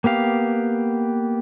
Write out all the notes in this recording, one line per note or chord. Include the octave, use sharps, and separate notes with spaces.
A#3 B3 G4 F5